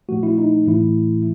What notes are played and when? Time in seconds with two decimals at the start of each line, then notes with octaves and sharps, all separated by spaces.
0.09 A#2 F3 A3 F#4
0.23 E4
0.38 D#4
0.67 A2 E3 A3 E4